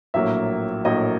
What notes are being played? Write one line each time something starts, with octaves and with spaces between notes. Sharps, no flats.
A#1 A2 F#3 A#3 E5
A#1 A2 F#3 A#3 D#5